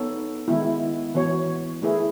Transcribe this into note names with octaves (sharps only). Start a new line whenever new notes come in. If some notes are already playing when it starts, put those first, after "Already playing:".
Already playing: B3 D#4 A4 C#5
D#3 G#3 B3 E4
E3 B3 F#4 C#5
A3 E4 G#4 B4